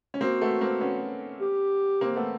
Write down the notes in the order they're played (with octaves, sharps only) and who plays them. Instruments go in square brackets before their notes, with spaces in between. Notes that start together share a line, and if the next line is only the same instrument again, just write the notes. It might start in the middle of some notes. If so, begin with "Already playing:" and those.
[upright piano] C#4
[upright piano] A#3 C4 [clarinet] F#4
[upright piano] A3 B3
A#3 C4
B3 C#4
[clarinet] G4
[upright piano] A#3 C4
A3 B3